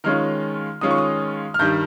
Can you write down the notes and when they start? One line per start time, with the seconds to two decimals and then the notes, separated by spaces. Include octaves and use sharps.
0.04 D#3 G#3 C#4 F4 F6
0.81 D#3 G#3 C#4 F4 D#6
0.91 C#6
0.98 D#6
1.54 F6
1.59 G2 D#3 G3 G6